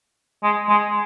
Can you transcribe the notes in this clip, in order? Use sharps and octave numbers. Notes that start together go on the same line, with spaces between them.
G#3
G#3